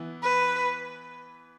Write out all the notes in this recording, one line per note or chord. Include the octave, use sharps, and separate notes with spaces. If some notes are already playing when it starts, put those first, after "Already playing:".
Already playing: E3 B3 E4
B4